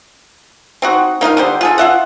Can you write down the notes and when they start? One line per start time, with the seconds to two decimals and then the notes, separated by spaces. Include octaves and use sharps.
0.82 C4 D#4 F#4
1.21 A#3 D#4 F4 F5
1.37 D3 G3 C5
1.61 F4 G#4 A4
1.78 F4 E5 F#5